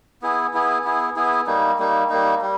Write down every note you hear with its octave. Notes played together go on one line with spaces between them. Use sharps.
B3 E4 G#4
B3 E4 G#4
B3 E4 G#4
B3 E4 G#4
G3 A#3 D#4
G3 A#3 D#4
G3 A#3 D#4
G3